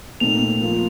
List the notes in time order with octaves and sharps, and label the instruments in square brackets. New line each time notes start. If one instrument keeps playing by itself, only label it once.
[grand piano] A#2 A3 C4 D#4 [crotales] F7
[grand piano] F3 A#3 F4